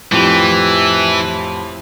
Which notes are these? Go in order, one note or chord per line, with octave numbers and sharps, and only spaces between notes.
F2 A2 E3 G4